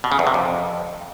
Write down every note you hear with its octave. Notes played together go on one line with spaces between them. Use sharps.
B2
C#3
E2
C3
F2